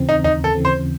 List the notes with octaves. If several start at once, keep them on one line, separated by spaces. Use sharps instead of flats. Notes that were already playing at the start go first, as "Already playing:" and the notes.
Already playing: D#2 C#3 E3 C4
D#4
D#2 D#4
A4
C#3 E3 C4
C5